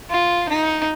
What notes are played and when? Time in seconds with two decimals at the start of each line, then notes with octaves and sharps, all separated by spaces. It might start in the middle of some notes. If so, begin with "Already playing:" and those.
0.10 F4
0.49 D#4